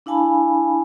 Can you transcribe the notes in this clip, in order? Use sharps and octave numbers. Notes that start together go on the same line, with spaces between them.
D4 E4 F5 G#5 A5 B5